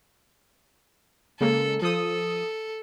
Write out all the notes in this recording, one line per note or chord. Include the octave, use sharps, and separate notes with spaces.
C#3 G#3 A#3 A4
F3 A4 D#6